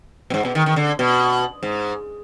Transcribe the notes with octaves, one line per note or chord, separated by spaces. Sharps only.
B2
G#2
B2
D#3
D#3
D3
B2
G#2